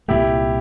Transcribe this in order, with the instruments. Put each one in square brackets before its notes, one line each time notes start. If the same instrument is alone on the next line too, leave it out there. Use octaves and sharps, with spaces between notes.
[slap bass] C2 A#2 A3 [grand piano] E4 G4